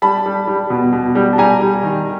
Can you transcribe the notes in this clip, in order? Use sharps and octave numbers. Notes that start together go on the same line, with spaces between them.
G3 A5 B5
G3
G3
B2
B2
G3
A5
G3 G#5 A#5
G3
D#3